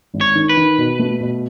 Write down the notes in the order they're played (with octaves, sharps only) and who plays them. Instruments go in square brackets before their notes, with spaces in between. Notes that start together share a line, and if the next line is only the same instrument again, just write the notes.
[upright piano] G#1
[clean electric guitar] C#5
[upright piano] D#3
[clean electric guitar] B4
[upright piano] D#3
B2
A3
B2